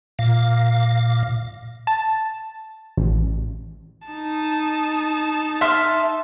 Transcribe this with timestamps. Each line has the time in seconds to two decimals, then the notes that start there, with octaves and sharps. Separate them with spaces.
0.19 A#2 F5
1.87 A5
2.97 A1
4.08 D#4 A5
5.61 E5 C6 F6